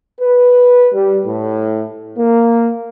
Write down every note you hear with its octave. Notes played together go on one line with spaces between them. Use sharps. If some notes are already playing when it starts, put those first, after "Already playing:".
B4
G3
A2
A#3